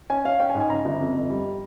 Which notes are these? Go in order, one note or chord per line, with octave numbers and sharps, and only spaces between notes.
C#4 G#5
C#4 F5
C#4 G5
G#5
G#2
G#5
C#3 A#5
G1
F2
G1
G3